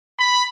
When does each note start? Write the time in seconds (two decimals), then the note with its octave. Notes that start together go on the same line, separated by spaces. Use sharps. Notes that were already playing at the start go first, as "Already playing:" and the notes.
0.19 B5